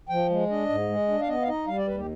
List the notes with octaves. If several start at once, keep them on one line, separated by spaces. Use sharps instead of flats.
F3 G5
G#3
D4 D#5
G#2
G#3
D4
F5
B3 D#5
F5
D#4 D#5
G3 F5
D5
D#2 B4
G4